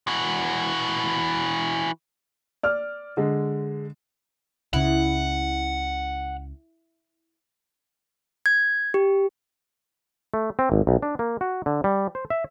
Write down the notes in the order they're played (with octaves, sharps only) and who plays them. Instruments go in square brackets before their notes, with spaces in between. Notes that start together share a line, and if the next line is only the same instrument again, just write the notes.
[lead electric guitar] E3 F#4
[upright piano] D5 F6
D3 G#3
[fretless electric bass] C#2 C#3 [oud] E4 [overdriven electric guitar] F#5
[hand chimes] G#6
G4
[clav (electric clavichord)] A3
C4
G#1
B1
D4
A#3
F#4
D3
G3
C5
E5